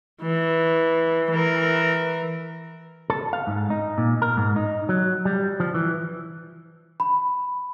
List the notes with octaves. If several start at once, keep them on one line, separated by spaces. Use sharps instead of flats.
E3
E3 A#4
A4
F5
G#2
D#4
A#2
A#4
G#2
D#4
F#3
G3
F3
E3
B5